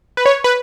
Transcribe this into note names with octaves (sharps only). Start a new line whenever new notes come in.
B4
C#5
B4